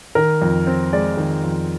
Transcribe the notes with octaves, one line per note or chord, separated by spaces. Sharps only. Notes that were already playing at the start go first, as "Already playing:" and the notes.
D#3 A#4
F2
C4
G#3 D5
D#3
F2